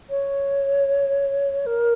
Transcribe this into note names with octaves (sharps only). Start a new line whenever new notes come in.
C#5
A#4